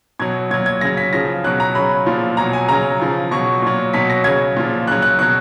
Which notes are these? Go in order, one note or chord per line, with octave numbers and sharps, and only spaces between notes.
B2 F#3 G#6
A#2 F#3 G#6
G#6
C#3 F#3 A#6
B6
C#3 F3 A#6
B2 F#3 F#6
A#5
C#3 F#3 B5
A#2 F3
B2 F#3 A#5
G#5
C#3 F#3 A#5
C#3 F3
B2 F#3 C#6
A#2 F#3
B2 F#3 B6
A#6
C#3 F#3 G#6
A#2 F3
C#3 F#3 F#6
F#6
B2 F#3 F#6